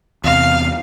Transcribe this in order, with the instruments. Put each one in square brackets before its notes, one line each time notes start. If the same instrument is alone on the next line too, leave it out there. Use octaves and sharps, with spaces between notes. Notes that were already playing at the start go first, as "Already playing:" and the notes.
[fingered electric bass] E2 C3 [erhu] F5